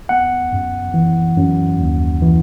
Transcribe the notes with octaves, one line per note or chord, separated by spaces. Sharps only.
B3 F#5
F#2
E3
F#2
D#2
E3